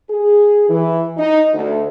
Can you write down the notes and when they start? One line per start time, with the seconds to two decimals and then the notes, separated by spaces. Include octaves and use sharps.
0.10 G#4
0.69 E3
1.17 D#4
1.53 D2